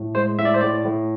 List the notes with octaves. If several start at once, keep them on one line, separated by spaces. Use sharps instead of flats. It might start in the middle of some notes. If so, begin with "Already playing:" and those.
Already playing: A2
G#3 C5
A2 E5
D5
C5
A2 D5
A2